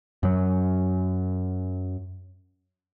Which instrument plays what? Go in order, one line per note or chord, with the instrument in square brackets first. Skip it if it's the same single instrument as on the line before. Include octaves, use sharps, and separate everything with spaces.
[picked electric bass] F#2 F#3